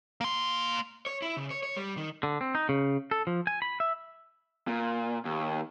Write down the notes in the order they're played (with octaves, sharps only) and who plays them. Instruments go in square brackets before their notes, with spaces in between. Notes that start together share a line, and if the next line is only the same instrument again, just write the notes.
[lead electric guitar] A#3 C6
C#5
E4
C#3
C#5
C#5
G3
D#3
[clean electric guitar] D3
C4
D#4
C#3
A4
F3
G#5
B5
E5
[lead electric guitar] A#2
D#2